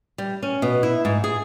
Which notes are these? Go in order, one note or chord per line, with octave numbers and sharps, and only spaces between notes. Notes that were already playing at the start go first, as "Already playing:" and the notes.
G3
C#4
B2
E4
G#2
G#4